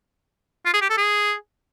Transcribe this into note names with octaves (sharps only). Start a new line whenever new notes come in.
F4
G#4
G4
A4
G#4